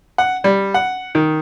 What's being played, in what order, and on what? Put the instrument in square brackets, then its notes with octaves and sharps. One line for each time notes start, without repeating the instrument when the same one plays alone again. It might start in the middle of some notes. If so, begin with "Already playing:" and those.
[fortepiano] F#5
G3
F#5
D#3